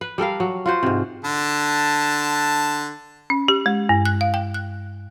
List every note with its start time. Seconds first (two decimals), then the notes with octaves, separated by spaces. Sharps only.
0.01 B4
0.18 G3 A4 A#4 F5
0.40 F#3
0.66 F4 F#4 C5
0.83 G#2 C3
1.24 D3 A5
3.30 C#4
3.48 G4
3.66 G#3
3.89 G2
4.06 F#6
4.21 F5
4.34 G5
4.54 F#6